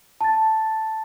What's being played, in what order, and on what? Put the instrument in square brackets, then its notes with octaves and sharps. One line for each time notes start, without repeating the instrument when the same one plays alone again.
[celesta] A5 A6